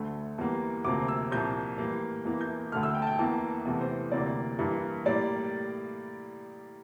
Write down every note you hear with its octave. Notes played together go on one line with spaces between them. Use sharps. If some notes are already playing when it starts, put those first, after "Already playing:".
Already playing: D2 D3 A3
E2 E3 G3 A#3
D2 C3 F3 A#3 D6
E6
C2 A#2 F3 A#3 G6
A2 E3 G3 A#3
E2 E3 A#3
G6
D2 D3 A3 F6
E6
G5
A5
G5
E2 E3 A#3 A5
E2 C3 E3 A3
C5
D2 C3 E3 A#3 D5
G2 E3 A#3
A2 G3 A#3 D5